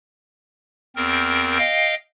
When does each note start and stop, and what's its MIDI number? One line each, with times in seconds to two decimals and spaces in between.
0.96 1.58 40
0.96 1.58 60
0.96 1.58 70
1.58 1.95 75
1.58 1.95 77
1.58 1.95 79